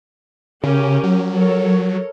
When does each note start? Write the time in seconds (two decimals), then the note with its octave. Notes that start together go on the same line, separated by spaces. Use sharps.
0.64 C#3 C#4 G4 A#4
1.03 F#3
1.33 A4 A#4 C#5